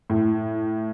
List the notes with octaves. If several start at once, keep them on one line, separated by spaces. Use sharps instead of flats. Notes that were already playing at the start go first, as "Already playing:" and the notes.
A2